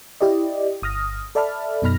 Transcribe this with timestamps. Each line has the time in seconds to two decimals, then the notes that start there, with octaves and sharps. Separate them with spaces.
0.21 E4 G4 D5 D#5
0.82 G1 D#6 F6 A#6
1.35 A4 D5 E5 A5 B5 F6
1.82 F#2 B2 D#4 B5 F6 A#6